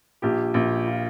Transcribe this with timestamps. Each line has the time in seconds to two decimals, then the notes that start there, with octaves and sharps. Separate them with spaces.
0.22 A#1 G4
0.54 A#1
0.87 F4